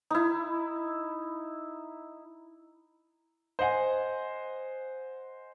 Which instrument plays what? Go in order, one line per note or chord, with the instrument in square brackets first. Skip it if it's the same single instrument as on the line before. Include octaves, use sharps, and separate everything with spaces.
[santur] D#4 E4
[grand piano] C5 D#5 F#5 G#5